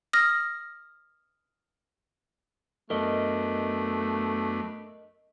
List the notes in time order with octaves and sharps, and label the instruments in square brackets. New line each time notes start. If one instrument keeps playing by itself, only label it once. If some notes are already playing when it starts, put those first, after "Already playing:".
[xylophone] D#6 F6 A#6
[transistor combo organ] F#2 B3 D4 [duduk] A3 [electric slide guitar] A#4 D#5